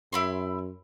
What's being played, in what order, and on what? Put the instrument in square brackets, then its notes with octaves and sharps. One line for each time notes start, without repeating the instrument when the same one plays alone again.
[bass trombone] F#2 [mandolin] E4 B5 C6